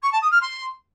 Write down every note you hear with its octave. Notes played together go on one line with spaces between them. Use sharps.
C#6
A5
D#6
F6
C6